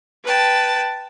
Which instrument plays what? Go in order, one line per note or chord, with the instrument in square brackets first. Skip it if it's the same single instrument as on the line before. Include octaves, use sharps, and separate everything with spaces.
[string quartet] B4 G5 A5